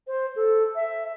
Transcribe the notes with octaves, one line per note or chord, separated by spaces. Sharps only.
C5
A4
E5